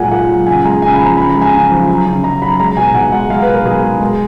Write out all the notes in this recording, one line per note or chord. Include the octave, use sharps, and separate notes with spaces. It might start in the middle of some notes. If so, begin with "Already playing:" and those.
Already playing: A#2 F#3 G#3 F#5 G#5
A#2 F#5
F#3
C#3 G#5
G#3 A#5
C#3 G#5
B5
F3
A#5
C#3 B5
A#5
G#3
G#5
C#3 G#5
F3
F#3
C#3
C#3 A#5
F#3 B5
G#3 A#5
B2 G#5
B2 F#5
G#3 F#5
G#3 F5
B4
B2
A#4
B2 G#4
G#3
G#3